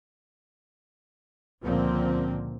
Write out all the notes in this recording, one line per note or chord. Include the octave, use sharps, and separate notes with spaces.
C#2 A#2 D3 F3 A#3 C4